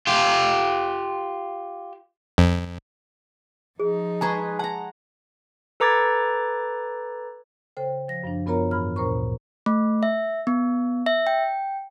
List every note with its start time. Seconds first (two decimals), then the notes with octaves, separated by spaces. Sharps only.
0.07 F4 G4
2.38 F2
3.80 F3 D#4 G#4
4.21 G#3 G#4 B4 A5 A#5 C#6
4.59 F#5 A5 A#5
5.80 A4 B4 A#5 D6 G#6 A6
7.77 C#3 A4 C5 G5
8.08 F3 A#6
8.24 F#2 F3 D4
8.46 F#2 B3 F4 A#4 C#5 A#5
8.71 G#2 E3 B5 F6
8.96 D2 A#2 A#4 C5 A#5 C#6
9.66 A3
10.03 E5
10.47 B3
11.06 E5
11.27 G5